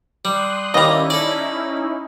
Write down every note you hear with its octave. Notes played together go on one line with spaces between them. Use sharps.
G3 C6 D#6 F#6
D#2 G3 C#4 D#4 E4 D#5 A#5
A4 D5